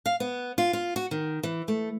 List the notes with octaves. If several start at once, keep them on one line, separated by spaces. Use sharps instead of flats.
F5
B3
F4
F4
F#4
D#3
E3
A3